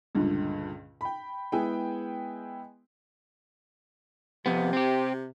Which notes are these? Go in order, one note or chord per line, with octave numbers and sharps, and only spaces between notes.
C#2 G2 A#2 D3
G5 B5
G#3 B3 E4 G#4 G5
F2 C3 B3
C4 G4